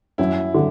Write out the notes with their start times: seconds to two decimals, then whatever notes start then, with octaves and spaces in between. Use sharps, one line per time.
0.18 F#2 E4
0.54 D3